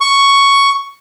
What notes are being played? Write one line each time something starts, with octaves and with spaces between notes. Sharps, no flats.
C#6